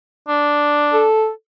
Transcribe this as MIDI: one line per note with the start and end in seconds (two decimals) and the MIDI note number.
0.28 1.05 62
0.93 1.30 69